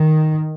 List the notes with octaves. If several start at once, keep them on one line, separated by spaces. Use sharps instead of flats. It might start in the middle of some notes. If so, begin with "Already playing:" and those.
Already playing: D#3